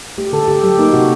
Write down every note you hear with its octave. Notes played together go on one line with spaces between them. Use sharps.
A3 G4
D3 A4
D3 G4
F#3 G4
A#3 D#4
C3 F#4